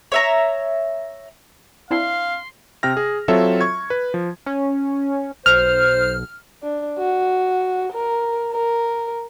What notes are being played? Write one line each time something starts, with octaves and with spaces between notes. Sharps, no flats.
C#5 E5 A#5
C4 D4 E4 F5 C6
C3 G5 F6 A#6
G#4
F#3 C4 F4 A4 C#5 E5
C#6 G#6
B4
F3
C#4
B1 C5 F6
D4
F#4
A#4
A#4